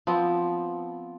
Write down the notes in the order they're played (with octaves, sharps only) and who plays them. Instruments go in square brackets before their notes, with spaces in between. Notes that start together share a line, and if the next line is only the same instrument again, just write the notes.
[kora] F3 B3 C4